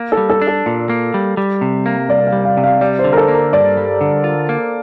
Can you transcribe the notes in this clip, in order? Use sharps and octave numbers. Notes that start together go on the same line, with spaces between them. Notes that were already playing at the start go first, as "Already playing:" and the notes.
Already playing: A#3
A4
G3
A4
D4
A4
A#2
A#3
G3
G3
C3
A#3
C2 D5
F5
G3
F5
C3
F5
G3 D5
C5
D3
A#4
A4
A#3
A#4
G2 D5
G3
D3
F4
A#3